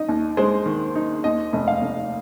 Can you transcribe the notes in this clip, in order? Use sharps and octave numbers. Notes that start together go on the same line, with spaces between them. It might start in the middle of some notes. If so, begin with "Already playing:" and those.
Already playing: D#4 D#5
D#2
G#3 C5
D#3
D#4
D#2 D#5
F1
F5
F1